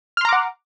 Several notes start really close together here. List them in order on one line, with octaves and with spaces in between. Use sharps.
F6 C6 A#5 D6 F#5